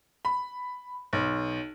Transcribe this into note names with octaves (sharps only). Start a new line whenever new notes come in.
B5
B1